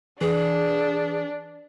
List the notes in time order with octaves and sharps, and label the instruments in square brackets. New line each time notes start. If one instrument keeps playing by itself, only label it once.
[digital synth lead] E3 [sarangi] D4 [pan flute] G#4